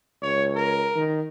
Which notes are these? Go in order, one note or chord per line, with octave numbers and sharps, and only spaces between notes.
C#2 C#5
A#4
D#3